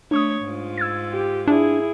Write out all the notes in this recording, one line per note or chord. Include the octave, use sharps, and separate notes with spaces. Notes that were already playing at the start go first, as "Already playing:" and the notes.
A3 D4 C#5 C#6 D#6
G#2 F4
E6 G#6 A6
G4
D4 E4 G#4